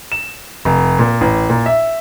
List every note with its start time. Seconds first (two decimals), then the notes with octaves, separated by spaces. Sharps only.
0.12 E7
0.65 F1
0.99 A#2
1.21 A1
1.50 A#2
1.66 E5